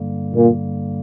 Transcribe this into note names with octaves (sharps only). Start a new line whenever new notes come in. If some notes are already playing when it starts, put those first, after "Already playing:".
Already playing: G2 D3 G3 A#3
A#2